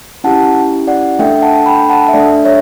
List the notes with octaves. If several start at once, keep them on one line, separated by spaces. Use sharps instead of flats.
C#4 E4 G4 F#5 A5
D5 F#5
A3 D4 A4 E5 G5
F#5 A5
G5 B5
F#5 A5
E5
A3 D4 A4 D5
C#5 E5